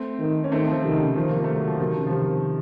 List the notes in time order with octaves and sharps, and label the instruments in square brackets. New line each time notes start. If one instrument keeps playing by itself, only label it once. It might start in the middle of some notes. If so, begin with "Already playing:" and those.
Already playing: [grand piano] A3 C4
[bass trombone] D#3
[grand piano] C#4
[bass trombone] D#3 [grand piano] A3 C4
[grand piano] F3 A3
[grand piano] C3 [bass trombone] D#3
[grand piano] C#3
[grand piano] C3 D#3 [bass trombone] F3
[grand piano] A#3
A3
F#3
F3
C3 D#3
C#3
F3
C3 D#3